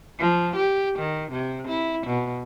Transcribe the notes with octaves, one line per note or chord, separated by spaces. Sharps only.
F3
G4
D#3
C3
E4
B2